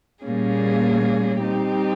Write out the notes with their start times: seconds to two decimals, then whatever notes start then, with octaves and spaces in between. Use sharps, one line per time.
0.25 A#2 G3 A#3 C#4 G#4
1.41 G3 C4 D#4 G4